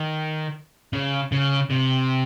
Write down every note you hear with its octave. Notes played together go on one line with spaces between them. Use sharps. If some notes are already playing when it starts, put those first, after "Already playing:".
Already playing: D#3
C#3
C#3
C3